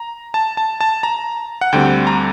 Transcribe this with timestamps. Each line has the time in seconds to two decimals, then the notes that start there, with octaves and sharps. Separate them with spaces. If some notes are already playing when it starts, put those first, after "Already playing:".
Already playing: A#5
0.34 A5
0.57 A5
0.81 A5
1.03 A#5
1.61 F#5
1.72 D2 D3 G3 C4 G5
2.07 A#5